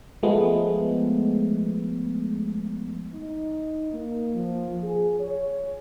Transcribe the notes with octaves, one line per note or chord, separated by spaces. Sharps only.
F3 G#3 A3 B3
D#4
A#3
F3
G#4
C#5